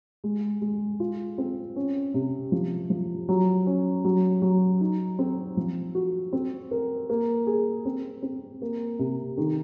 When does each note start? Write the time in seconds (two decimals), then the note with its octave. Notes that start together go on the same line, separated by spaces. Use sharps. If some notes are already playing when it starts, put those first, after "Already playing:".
0.24 G#3
0.62 G#3
1.00 F4
1.38 C4
1.76 C#4
2.14 C3
2.52 F3
2.90 F3
3.29 F#3
3.66 C#4
4.05 F#3
4.42 F#3
4.81 D#4
5.19 C4
5.57 F3
5.95 F#4
6.33 C4
6.71 A#4
7.10 A#3
7.47 G#4
7.85 C4
8.23 C4
8.62 A#3
8.99 C3
9.38 D#3